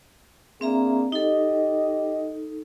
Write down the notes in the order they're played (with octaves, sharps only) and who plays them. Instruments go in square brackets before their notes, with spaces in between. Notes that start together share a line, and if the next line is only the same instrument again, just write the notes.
[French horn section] A#3 D4 G#4 [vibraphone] C4 E5 A#5
[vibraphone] D#4 A4 [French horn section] G4 D#5